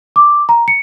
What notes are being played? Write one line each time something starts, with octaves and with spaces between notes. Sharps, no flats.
D6
A#5
C#7